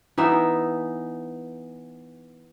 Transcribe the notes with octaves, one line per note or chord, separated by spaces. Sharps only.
E3 B3 D#4 E5